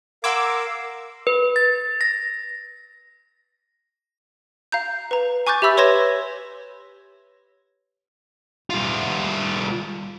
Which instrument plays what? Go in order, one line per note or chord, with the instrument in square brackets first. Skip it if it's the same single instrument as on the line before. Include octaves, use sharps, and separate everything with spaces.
[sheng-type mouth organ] A#4 F5 [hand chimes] F#5 C6 G#6 [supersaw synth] D6 E6
[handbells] B4
A6
A#6
[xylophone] F5 A#5 G6
B4 A#5
G#5 C#6 D6 F#6 G6 A6
G4 E5 B5 E6 B6
B4 C#5 C6 G#6 A#6 E7
[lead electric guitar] G3 F4